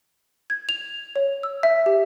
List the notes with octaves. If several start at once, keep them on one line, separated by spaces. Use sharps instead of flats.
G#6
F7
C#5
E6
E5
G4